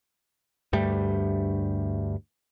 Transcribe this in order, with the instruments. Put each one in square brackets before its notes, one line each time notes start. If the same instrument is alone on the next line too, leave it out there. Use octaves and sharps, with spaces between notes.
[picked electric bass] D2 G2 G3 A3